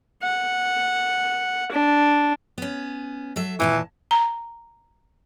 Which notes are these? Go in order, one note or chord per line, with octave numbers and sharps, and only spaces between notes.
F#5
D4
B3 C#4
F#3 A4 E5
D#2 A#2 E3 A5
A#5